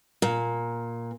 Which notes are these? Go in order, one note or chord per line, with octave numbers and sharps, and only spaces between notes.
A#2